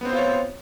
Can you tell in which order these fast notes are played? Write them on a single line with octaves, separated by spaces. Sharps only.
B3 C4 C5 F4 C#5